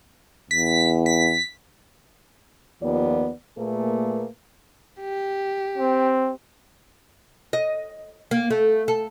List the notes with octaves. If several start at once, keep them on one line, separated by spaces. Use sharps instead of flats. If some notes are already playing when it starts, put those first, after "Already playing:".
E2 B6
B6
D#2 F3 B3 F4 D5
A#2 A3 A#3 G#4 B4
G4
C4
D#5
A#3
A3
A4